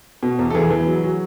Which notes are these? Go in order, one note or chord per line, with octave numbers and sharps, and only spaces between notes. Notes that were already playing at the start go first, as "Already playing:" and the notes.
B2
E2
A4
E3 G#4
E3
F#3
F#3